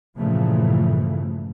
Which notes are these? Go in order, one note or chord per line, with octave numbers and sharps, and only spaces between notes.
G2 A#2 C#3 E3 F3 A3